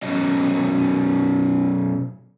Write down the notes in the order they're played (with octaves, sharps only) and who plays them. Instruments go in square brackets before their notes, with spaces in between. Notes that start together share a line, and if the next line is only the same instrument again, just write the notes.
[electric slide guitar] B2 F#3 C#4 D#5